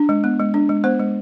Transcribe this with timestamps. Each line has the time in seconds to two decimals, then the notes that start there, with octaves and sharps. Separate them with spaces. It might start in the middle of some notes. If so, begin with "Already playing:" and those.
Already playing: D4
0.09 G#3
0.24 B3
0.39 G#3
0.54 D4
0.69 G#3
0.84 B3 C5
0.99 G#3